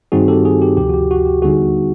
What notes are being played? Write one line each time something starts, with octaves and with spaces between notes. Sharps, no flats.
G2 D#3 G3 C4 D#4 F#4 G#4
G4 A4
F#4 G#4
G4
D2 C3 F3 G4
F#4
G4
F#4
G4
D#2 D3 G3 B3 D#4 F#4 G#4